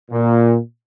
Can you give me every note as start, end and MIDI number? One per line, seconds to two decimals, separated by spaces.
0.11 0.57 46